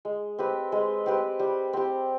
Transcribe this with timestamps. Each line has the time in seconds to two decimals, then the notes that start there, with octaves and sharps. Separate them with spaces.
0.05 G#3
0.38 C4 G4 B4
0.72 G#3
1.06 C4 G4 B4
1.39 G3
1.73 C4 G4